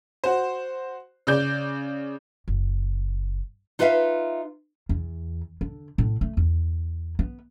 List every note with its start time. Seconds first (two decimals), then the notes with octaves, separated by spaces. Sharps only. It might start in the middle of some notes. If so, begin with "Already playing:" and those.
0.24 F#4 C5
1.27 C#3 D5 G6
2.48 F#1
3.79 D#4 F4 B4 C5 E5 F5
4.89 E2
5.61 D3
5.98 A2
6.21 A3
6.37 E2
7.19 B3